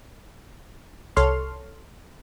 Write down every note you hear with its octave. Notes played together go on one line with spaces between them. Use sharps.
C2 A4 C#5 C6 F6